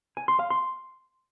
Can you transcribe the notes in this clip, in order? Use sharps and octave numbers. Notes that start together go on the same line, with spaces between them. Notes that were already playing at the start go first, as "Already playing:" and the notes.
G#5
C6
F5
C6